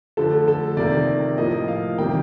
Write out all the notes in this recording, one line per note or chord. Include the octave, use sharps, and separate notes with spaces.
D3 F3 A3 A4
A4
C3 D#3 A#3 D5
A2 F3 A#3 D#5
F5
C3 D#3 G3 A#3 G5